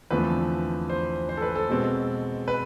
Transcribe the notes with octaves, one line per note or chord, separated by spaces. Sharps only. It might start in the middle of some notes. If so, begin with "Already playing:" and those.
E2 D3 F3 A3 C4 B4
C5
C5
A4
B4
A4
B2 G#3 C4
B4